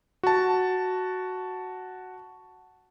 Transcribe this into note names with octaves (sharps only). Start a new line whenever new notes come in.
F#4 A5